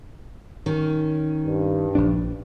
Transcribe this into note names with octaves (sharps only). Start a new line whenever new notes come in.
D#3 C#4
G2
A#1 F3 D4